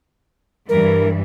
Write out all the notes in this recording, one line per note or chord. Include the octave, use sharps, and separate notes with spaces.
G2 E3 A#4